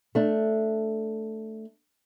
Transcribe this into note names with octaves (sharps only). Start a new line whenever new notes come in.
A3 D4